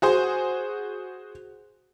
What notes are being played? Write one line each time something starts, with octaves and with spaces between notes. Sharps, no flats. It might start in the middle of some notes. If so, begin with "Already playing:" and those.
F#4 G#4 C5